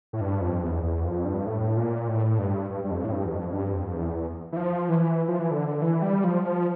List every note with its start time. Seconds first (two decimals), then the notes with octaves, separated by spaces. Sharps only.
0.13 A2
0.21 G2
0.41 F2
0.63 E2
0.83 E2
1.04 F2
1.25 G2
1.46 A2
1.77 A#2
2.08 A2
2.38 G2
2.70 G2
2.84 G2
2.91 F2
3.05 A2
3.12 G2
3.25 E2
3.33 F2
3.53 G2
3.74 F2
3.94 E2
4.52 E3
4.57 F3
4.89 E3
5.28 F3
5.39 E3
5.51 D3
5.82 E3
6.02 G3
6.24 F3
6.45 F3